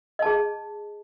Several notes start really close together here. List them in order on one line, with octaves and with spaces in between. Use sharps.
D#5 A5 G#4